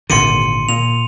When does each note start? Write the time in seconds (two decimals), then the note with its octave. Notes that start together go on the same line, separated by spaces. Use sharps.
0.10 G#1 A#2 D3 C6 C#7 D#7
0.69 A#2 F7